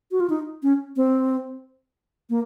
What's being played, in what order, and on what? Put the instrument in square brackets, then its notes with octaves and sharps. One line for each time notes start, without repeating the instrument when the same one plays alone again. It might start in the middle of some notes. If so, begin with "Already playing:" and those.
[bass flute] F#4
F4
D#4
C#4
C4
A#3